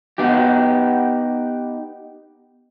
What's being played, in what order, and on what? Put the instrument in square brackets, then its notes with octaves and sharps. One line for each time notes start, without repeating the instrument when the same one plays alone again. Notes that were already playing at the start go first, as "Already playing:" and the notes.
[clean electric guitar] B3 D#4 G4